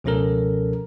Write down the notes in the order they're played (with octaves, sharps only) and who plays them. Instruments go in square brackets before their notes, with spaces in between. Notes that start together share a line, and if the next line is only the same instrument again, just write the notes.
[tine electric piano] C#2 B2 F3 C#4 A4 A#4